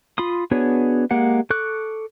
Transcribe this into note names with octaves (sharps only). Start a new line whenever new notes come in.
F4 B5 C6 D#6
B3 D4 F#4 G#4 C#5
G#3 A#3 G4 F#5
A4 C#6 D6 F#6